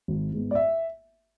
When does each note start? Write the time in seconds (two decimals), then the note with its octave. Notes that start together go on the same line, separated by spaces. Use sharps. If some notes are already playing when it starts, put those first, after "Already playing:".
0.08 G#1
0.32 G#2 G#3 B3
0.51 D5
0.55 E5